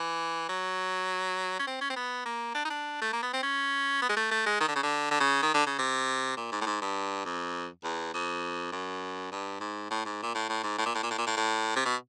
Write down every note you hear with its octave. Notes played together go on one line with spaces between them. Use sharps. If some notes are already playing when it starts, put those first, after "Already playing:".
Already playing: E3
F#3
C#4
C4
C#4
C4
B3
A#3
D4
D#4
D4
A3
A#3
B3
C4
C#4
B3
G#3
A3
A3
G#3
D#3
D3
C#3
D3
D3
C#3
D#3
D3
C#3
C3
A#2
G#2
A2
G#2
G2
F2
E2
F2
F#2
G2
G#2
A2
G#2
A#2
A2
A2
G#2
A2
A#2
A2
A#2
A2
A#2
A2
A2
C3
B2